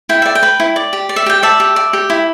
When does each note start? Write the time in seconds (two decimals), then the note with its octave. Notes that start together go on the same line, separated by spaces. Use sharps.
0.09 E4 G5
0.22 D5 E5
0.35 G5
0.43 B4
0.60 E4
0.76 D5
0.93 G4
1.09 D5
1.16 E5
1.26 G4 G5
1.43 D5 E5 A5
1.60 G4
1.76 D5
1.93 G4
2.10 E4